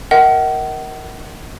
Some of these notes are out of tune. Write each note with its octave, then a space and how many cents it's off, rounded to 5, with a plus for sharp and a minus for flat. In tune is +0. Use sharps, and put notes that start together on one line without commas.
A#4 +0 D#5 +35 F#5 +35